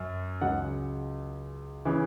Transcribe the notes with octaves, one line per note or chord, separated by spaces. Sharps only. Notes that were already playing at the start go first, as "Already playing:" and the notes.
Already playing: F#2
C#2 C#3 F#3 F#5
C#3 E3